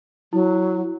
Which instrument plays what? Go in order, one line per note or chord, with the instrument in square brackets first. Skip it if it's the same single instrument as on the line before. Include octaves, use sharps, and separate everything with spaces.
[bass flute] F#3 [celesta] E4